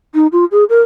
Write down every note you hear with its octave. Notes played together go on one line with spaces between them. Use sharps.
D#4
F4
G#4
A#4